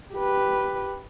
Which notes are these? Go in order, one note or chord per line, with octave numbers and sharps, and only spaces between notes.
G4 B4